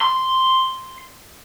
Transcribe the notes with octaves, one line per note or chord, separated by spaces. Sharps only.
C6